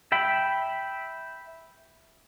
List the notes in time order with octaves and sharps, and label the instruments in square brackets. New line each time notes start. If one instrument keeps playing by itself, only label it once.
[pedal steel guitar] E5 G5 B5